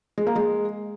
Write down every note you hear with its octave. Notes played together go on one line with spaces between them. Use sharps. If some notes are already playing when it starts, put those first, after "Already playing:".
G#3
A#3
G#3